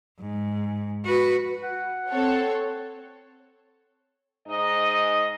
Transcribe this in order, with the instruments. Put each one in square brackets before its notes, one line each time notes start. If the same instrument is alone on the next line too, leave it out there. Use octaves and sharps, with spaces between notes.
[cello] G#2
F#4 B4
[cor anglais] F#5
[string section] C4 A4 C#5
[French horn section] G#2 D#4 D#5